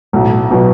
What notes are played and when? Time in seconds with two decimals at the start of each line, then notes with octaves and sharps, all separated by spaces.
0.13 B1 A2
0.51 B2 F#3